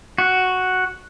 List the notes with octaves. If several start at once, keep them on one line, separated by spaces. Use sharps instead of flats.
F#4